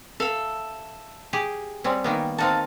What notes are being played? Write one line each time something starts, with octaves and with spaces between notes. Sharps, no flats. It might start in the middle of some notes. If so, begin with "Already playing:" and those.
A4 E5 F5
G4 G#4
G3 C4 C#4
D#3 A#3 B3
C4 D#4 F#4 F5 A5